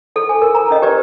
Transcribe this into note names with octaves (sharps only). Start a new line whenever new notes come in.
G#4 A4
G#5
A#4
A#5
C#4 D#5
G4 A#4 B4 D5